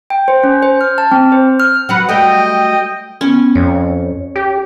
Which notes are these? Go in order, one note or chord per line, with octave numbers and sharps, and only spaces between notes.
G5
C5
C#4
C5
F6
A5
C4
C5
F6
F#3 F#4 B4 F#5
F#3 G3 A3 D#5 G5
B3 C#4
F2 C#5
G4